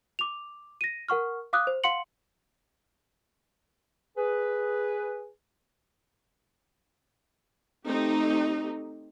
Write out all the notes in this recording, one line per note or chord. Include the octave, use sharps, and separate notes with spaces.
D6 F7
A#6 D#7
A#4 F#5 C#6 F6
F5 D6 D#6 F#6
C5
F5 F#5 C6 C#7 F#7
G#4 B4
A3 C4 D#4 G4